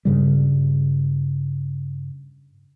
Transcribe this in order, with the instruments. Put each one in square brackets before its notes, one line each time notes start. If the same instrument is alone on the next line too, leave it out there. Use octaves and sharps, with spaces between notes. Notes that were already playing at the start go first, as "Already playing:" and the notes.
[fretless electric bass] G2 C#3 G3